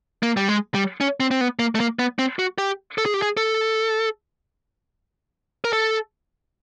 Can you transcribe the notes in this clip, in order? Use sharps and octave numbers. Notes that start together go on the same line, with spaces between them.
A#3
G3
G#3
G3
C#4
C4
C4
B3
A#3
A3
A#3
B3
C4
F#4
G4
A4
G#4
G4
G#4
A4
A#4
A4